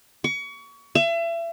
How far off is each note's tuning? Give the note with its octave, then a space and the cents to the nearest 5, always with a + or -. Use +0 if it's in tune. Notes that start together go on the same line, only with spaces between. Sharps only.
C#6 +30
E5 +35